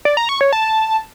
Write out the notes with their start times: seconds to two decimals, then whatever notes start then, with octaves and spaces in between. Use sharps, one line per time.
0.05 D5
0.17 A#5
0.29 C#6
0.41 C#5
0.53 A5